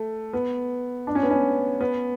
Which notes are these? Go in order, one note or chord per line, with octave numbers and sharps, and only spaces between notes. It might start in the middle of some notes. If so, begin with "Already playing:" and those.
Already playing: A3
B3
D4
C#4
B3
C#4
B3